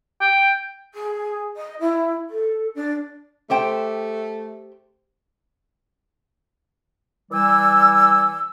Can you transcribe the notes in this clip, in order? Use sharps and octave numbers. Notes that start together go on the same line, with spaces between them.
G5
G#4
D#5
E4
A4
D4
A3 G4 C5 G5
E3 G3 B4 D5 G#5 E6